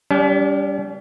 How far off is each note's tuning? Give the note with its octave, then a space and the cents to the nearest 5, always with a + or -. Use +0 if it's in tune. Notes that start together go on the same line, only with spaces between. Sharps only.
G3 +0 C#4 +45